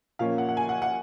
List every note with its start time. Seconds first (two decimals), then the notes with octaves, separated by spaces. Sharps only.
0.19 A#2 F3 A#3 C#4 F5
0.38 F#5
0.49 F#5
0.57 G#5
0.69 F#5
0.82 F#5